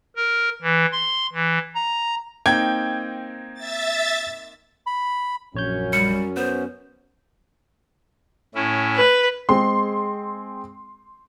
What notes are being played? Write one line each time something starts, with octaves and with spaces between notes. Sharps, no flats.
A#4
E3
C6
E3
A#5
A#3 C4 D#4 G5 G#6
E5 A6
B5
A#1 F#2 F#3 C#4 C#5 G6
G3 C#7
B3 C5
A2 C#4 E4
B4
G#3 C4 G#4 C6